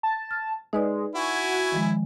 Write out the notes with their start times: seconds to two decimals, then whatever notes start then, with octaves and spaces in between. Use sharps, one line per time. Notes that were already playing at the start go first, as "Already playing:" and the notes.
0.03 A5
0.31 F6
0.73 G#3 D#4 B4 D5
1.15 E4 F#4 G#5
1.72 D#3 F3 G#3